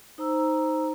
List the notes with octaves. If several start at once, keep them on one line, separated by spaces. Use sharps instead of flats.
D#4 C5 A#5 E6